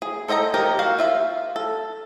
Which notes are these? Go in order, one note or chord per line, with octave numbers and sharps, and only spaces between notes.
G#4
A4 C5 D#5 G5 A#5
F3 D#4 G4 A#4
F#4 F5
F4 E5 F5
A4